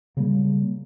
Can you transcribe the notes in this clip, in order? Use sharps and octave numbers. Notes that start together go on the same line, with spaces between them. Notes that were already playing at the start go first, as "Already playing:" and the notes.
C#3 F#3 G3 A#3